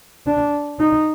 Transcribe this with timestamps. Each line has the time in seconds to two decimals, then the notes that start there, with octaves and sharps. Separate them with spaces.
0.27 D4
0.80 D#4